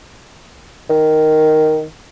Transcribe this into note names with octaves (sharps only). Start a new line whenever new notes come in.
D#3